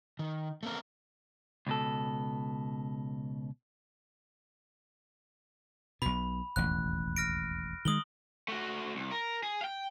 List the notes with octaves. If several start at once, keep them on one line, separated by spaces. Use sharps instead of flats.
D#3
A3 A#3 C4 A#4
C#2 B2 A4
B1 B2 B5
E1 A1 D#2 F#6
F6 A#6 D7
D#3 F3 G#3 D#6 F#7 G7
A3 F#4
C2
A#4
G#4
F5 G5